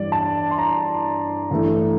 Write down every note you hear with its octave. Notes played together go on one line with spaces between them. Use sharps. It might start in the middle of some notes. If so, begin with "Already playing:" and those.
Already playing: G2 E3 G3 D5
A5
C6
A#5
G2 E3 A3